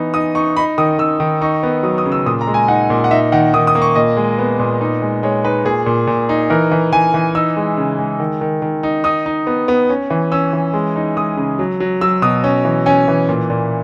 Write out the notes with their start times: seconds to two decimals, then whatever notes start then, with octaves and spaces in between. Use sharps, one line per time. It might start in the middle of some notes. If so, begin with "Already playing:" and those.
Already playing: E3 B3 D#4
0.14 D#4 D#6
0.35 D#4 C#6
0.57 D#4 B5
0.78 D#3 D#6
0.99 D#3 E6
1.20 D#3
1.41 D#4 C#6
1.63 B3
1.83 F#3 D#6
1.98 D#6
2.05 C#3
2.12 E6
2.26 A#2 D#6
2.41 A#5
2.47 G#3
2.54 G#5
2.68 D#4 F#5
2.90 A#2
3.04 F#5
3.11 D#4 E5
3.32 D#3 F#5
3.54 D#3 D#6
3.67 D#6
3.75 A#3
3.82 C#6
3.95 A#2 D#5
4.17 G#3
4.39 B3
4.59 A#2
4.81 D#4
5.02 G#3
5.23 G#3 C#5
5.44 D#4 B4
5.65 A#2 G#4
5.86 A#2
6.07 A#2
6.29 D#4
6.50 E3 A#4
6.71 E3
6.92 E3 G#5
7.14 E3
7.35 D#4 E6
7.57 G#3
7.77 C#3
7.98 G#3
8.20 D#3
8.41 D#3
8.62 D#3
8.83 D#4
9.04 D#4 D#6
9.26 D#4
9.47 B3
9.68 B3
9.90 C#4
10.10 E3
10.32 C#4 E6
10.53 E3
10.74 G#3
10.96 D#4
11.17 G#3 D#6
11.37 C#3
11.59 F#3
11.80 F#3
12.01 F#3 E6
12.22 B2 D#6
12.44 C#4
12.65 E3
12.86 C#4 G#5
13.08 E3
13.29 A#2
13.50 A#2